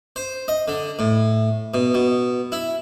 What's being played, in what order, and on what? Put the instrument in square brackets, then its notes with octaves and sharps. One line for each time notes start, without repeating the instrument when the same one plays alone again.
[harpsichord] C5
D#5
D3
A2
B2
B2
E4